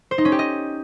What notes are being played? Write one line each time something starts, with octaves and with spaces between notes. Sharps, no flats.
C5
D#4
C#4
G4
D#5